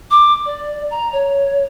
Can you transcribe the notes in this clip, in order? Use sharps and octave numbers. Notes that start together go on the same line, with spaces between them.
D6
D5
A#5
C#5